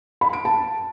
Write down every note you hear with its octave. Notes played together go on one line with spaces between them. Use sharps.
B5
D7
A5